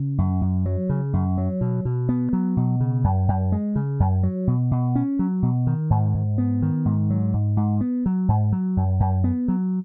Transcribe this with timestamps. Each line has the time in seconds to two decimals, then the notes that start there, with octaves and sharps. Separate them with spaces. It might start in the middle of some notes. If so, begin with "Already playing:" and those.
Already playing: C#3
0.18 F#2
0.41 F#2
0.66 F#3
0.89 C#3
1.13 F#2
1.38 F#3
1.61 B2
1.85 B2
2.09 B3
2.33 F#3
2.57 B2
2.80 C#3
3.04 F#2
3.28 F#2
3.52 G#3
3.76 C#3
4.00 F#2
4.23 F#3
4.47 B2
4.71 B2
4.95 C#4
5.19 F#3
5.42 B2
5.67 D#3
5.90 G#2
6.14 G#2
6.38 B3
6.62 D#3
6.85 G#2
7.10 F#3
7.34 G#2
7.57 G#2
7.81 B3
8.06 F#3
8.28 G#2
8.52 F#3
8.77 F#2
9.00 F#2
9.24 B3
9.48 F#3